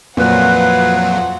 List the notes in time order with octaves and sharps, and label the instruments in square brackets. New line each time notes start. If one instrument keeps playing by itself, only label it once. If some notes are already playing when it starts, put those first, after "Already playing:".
[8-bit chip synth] F2 F#3 [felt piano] A#2 [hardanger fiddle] F4 F#5 [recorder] B4